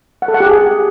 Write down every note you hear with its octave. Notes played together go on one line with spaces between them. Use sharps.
F#5
A4
F#5
G4
G#4